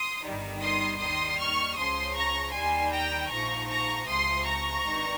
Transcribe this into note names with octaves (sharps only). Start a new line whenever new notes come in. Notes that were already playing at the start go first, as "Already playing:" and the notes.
Already playing: C6 D#6
G1 G2 D#3 G3
C6 D#6
D#2 D#3 G3 C6 D#6
C#6 F6
C#2 C#3 F3 C6 D#6
A#5 C#6
D#2 D#3 G3 G#5 C6
G5 A#5
A#1 G#2 F3 A#5 C#6
A#5 C#6
C#2 C3 F3 C6 D#6
A#5 C#6
G#1 G2 D#3